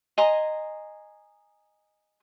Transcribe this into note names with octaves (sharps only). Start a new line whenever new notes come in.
D#5 G#5 A#5 C6